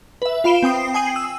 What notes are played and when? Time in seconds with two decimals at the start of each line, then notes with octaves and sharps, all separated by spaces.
0.22 B4 E5
0.44 F4 F5 B5 D7 E7 G7
0.62 C4 G5 D#6 C7
0.94 G5 G#5 D#6 C7 D#7 F#7
1.16 E6